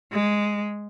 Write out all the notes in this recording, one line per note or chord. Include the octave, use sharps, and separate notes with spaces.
G#3